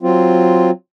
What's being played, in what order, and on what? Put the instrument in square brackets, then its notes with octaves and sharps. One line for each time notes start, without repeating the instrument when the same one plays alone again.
[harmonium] F#3 C4 F4